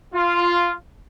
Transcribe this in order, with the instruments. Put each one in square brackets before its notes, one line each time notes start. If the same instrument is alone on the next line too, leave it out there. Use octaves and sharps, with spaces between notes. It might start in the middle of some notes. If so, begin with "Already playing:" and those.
[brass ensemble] F4